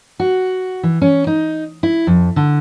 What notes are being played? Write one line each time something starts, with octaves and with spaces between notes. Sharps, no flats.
F#4
E3
C#4
D#4
E4
F2
D3